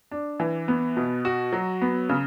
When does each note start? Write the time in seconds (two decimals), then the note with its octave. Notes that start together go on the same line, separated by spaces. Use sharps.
0.11 D4
0.40 E3
0.68 B3
0.97 B2
1.25 F#4
1.53 F#3
1.81 B3
2.09 C#3